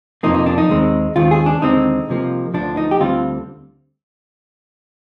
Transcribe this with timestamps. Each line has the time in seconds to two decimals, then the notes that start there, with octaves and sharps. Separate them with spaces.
0.23 F2 C3 F3 A#3 D#4
0.34 D#4
0.46 D4
0.58 D#4
0.69 D#2 D#3 G#3 C4
1.16 D#2 D#3 G#3 C4 F4
1.31 G#4
1.46 D4
1.61 D#2 D3 G#3 C4 D#4
2.08 C2 C3 F3 A#3
2.54 D2 D3 F3 D4
2.77 D#4
2.91 G4
3.00 D2 D3 G3 C4 F4